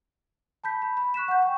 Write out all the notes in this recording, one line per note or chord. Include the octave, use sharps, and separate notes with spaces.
A5 B5 G6 B6
B5
B5
C#6 F#6 B6 E7
F#5 G6
G5 C#6